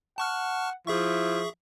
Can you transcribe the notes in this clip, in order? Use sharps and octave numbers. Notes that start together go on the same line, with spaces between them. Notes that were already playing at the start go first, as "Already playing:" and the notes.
F#5 A5 C#6 F6
F3 E4 G#4 E5 C#6